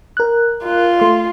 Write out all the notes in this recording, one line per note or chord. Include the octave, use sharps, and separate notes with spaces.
A#4 F#6
F4
A3 C6